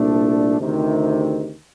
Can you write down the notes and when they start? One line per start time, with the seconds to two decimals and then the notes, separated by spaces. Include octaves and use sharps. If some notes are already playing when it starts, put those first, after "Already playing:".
Already playing: C2 A#2 A3 D4
0.59 D2 C3 D#3